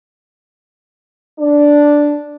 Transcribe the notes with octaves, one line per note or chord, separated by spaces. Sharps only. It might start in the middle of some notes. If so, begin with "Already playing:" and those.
D4